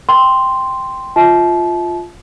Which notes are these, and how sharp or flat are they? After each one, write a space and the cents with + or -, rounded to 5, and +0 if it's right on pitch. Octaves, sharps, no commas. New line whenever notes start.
G5 +0 C6 -5
F4 +0 E5 -35 A5 -30